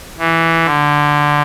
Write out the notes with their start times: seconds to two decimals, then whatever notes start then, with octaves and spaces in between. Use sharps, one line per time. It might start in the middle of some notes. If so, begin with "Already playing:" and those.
0.18 E3
0.65 D3